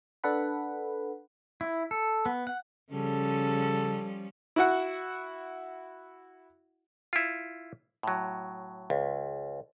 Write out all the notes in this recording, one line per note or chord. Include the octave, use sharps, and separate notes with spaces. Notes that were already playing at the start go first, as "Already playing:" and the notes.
D4 A4 B4 F#5 B5
E4
A4
B3
F#5
C#3 F3 G3 C#4 A4
E4 F#4 F#5
E4 F4
A2 F#3
C#2